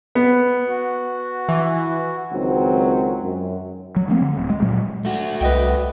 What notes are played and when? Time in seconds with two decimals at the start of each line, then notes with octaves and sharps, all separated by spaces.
0.15 B3
0.67 F#4
1.48 E3
2.32 C#2 G#2 D#3 F#3 C4
3.22 F#2
3.96 F#3
4.08 F3 A3 A#3 C4
4.21 D3
4.37 D1
4.50 G#3
4.62 A#2 F#3 G#3
5.05 A3 F#4
5.41 C2 B4 D#5 G5